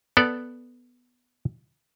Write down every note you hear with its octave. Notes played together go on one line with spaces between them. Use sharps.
B3 A4 D5